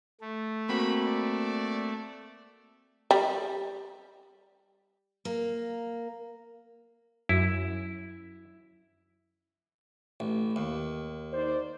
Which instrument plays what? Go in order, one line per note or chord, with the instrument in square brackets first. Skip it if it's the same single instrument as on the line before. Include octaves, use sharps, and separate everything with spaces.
[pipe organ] A3
[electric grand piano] A#3 C4 F#4 [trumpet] B5
[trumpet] D5
[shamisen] G3
[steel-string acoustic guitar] A#3
[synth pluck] F#2 [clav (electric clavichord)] E4
[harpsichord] A1
D#2
[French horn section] D#4 C5 D5